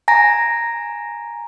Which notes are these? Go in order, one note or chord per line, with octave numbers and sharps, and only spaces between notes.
G#5 A#5 A#6